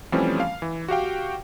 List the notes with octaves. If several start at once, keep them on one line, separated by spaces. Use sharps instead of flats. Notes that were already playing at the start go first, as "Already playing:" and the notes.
E3 F3 G3 A3 C4 C#4
F5
E3
F#4 G4 F5 G5